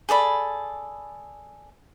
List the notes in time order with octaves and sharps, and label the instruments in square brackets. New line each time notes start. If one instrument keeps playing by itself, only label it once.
[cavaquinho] G#4 A4 D5 B5